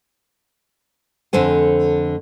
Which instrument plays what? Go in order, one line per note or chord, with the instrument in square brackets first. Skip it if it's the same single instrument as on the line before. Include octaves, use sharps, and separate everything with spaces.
[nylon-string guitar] F2 D3 A3 C5 G#5